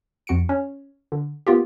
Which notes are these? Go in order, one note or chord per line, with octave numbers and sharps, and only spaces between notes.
F2 F#4 C#7 D7
C#4
D3
A#3 B3 F4 G4